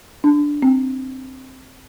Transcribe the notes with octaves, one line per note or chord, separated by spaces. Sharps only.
D4
C4